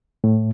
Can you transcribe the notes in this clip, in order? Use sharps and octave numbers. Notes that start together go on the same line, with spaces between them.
A2